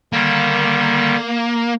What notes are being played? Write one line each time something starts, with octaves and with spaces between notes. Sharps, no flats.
D3 D#3 G3 A#3